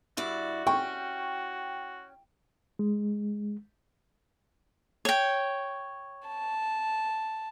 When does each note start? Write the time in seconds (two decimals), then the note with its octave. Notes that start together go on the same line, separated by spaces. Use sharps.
0.17 G2 E4 F#4 D5
0.67 C#4 G5 C#6
2.79 G#3
5.05 C#5 G5
6.28 A5